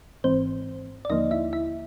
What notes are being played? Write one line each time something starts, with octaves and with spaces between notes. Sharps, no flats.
G#1 G#2 E3 C4 C5
D5
D#2 D3 F3 A#3 D#4 D#5
E4 E5
E4 E5